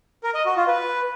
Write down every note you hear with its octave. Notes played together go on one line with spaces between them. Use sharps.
A#4
D#5
F#4
F4
B4